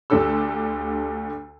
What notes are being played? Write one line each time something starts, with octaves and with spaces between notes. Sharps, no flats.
D2 D3 G4 A4 E6